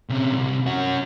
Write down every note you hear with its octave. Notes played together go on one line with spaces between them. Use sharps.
C3 C#4
C2 C3
C#4 F#4